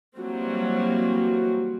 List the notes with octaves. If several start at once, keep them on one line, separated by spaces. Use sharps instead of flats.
E3 F#3 G3 A#3 C4 F#4